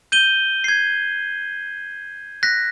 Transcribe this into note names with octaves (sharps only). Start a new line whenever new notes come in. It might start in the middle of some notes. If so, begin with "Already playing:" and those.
G6 D#7 G7
G#6 C7
F#6 A#6 B6